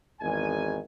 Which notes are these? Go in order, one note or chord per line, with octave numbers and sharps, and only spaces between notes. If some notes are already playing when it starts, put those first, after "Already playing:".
G#1 E2 D#3 G#5